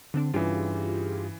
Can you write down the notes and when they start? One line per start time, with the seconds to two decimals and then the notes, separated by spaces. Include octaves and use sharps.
0.14 D3 C4 D4
0.34 G2 C#3 E3 F4 G4 G#4